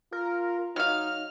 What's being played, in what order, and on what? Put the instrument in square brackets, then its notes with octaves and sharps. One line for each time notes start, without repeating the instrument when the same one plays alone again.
[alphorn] F4 [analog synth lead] A#4
[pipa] F#3 F5 [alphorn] D#4 [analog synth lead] F6